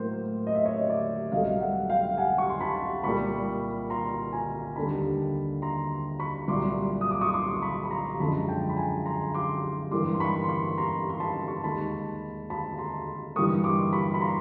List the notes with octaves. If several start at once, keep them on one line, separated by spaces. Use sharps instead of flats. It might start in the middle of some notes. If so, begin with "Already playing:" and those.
Already playing: A2 F#3 A#3 C5
D#5
E5
C#5 D#5
D5 E5
C2 B2 F#3 A3 D#5 F5
E5 F#5
F5 G5
F#5 G#5
C#6
C6
A5 B5
C2 A#2 G3 A#3 B5 C#6
A#5 C6
G#5 A#5
D#2 D3 G3 A#3 A5 B5
A#5 C6
B5 C#6
C2 A#2 F#3 C6 D6
D#6
D6
C#6 D#6
C6 D6
B5 C#6
B5
A#5 C6
F#2 D3 F3 G#3 A5 B5
G5 A5
B5
G#5 A#5
A#5 C6
C6 D6
G2 E3 G3 A#3 C6 D6
C6
B5 C#6
C6
B5 C#6
A#5 C6
C6
A5 B5
C#6
C6
D#2 D#3 G#3 A5 B5
A5 B5
A#5 C6
G2 E3 G3 A#3 C#6 D#6
C6 D6
B5 C#6
B5
A#5 C6